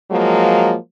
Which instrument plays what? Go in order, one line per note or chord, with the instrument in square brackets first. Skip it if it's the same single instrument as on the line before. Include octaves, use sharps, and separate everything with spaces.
[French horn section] F3 F#3 G#3 A#3